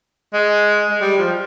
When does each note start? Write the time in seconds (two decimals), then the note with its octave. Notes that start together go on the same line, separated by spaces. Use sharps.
0.34 G#3
0.91 G#3
1.01 G3
1.18 F3